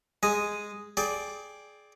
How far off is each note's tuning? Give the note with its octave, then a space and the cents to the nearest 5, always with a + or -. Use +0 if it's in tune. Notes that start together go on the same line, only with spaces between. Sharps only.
G#3 +0 D#5 +0 G#5 +0
G#4 +25 D5 +0 G5 +25